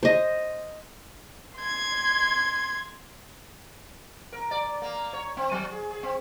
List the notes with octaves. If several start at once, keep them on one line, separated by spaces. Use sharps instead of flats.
C5 D#5
C6 G#6
A#4
D5
A#3
C#5
C4
F#3
G#4
G#4
C4